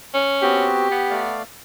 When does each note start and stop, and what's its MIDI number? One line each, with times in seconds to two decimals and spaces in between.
0.14 0.69 61
0.42 0.88 59
0.42 0.88 60
0.42 0.88 66
0.42 1.24 67
0.92 1.40 59
1.10 1.43 57
1.10 1.43 74
1.10 1.43 77